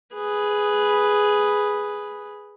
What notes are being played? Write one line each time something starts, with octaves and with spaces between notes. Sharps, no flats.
G#4 B4